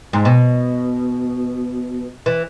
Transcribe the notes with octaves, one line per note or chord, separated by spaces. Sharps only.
G#2
B2
E3